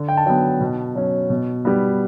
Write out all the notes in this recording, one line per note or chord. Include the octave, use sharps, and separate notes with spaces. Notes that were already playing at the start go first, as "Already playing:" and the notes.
Already playing: D3
G5
A5
F#3 B3 G5
B2
F#3 C#4
B2
G3 B3